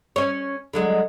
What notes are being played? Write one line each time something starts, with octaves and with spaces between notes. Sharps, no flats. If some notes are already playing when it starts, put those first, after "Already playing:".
C#4 C#5
D3 F#3 G#3